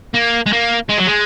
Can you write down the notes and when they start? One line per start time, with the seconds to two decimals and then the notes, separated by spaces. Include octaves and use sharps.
0.15 A#3
0.46 G#3
0.52 A#3
0.89 G#3
0.98 F#3
1.07 G#3